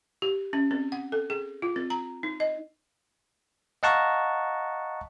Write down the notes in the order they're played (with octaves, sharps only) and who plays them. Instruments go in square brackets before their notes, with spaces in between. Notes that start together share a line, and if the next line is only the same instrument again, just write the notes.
[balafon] G4
C#4
C4
F#5
A4
G#4
F4
C4
A#5
D#4
D#5
[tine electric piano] D#5 F5 F#5 A5 A#5 C#6